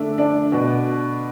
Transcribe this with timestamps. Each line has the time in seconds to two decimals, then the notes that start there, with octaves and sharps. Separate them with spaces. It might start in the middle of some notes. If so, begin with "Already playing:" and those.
Already playing: D3 A3 D4
0.18 D4
0.52 B2